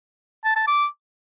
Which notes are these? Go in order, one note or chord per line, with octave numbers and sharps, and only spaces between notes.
A5
A5
D6